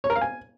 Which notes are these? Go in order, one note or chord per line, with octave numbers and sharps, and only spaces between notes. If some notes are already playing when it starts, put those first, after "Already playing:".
C#5
A#4
F5
G#5